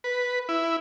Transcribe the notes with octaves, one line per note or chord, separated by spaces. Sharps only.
B4
E4